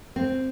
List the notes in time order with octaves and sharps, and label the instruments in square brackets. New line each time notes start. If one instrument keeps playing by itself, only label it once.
[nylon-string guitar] C4